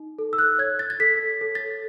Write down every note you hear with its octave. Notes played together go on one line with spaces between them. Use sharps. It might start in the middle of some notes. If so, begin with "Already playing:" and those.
Already playing: D#4
A4
E6
F#6
C#5 G#6
A6
A6
A4 B6
A4
A6